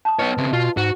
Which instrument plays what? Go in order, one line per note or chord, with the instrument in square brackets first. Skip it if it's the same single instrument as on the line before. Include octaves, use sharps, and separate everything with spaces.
[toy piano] A5 D#6
[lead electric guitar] B3 C#5 [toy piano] E4 B4 D#5
[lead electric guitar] C#3 C4
[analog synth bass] B2 [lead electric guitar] F4
[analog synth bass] G#2 [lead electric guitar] F#4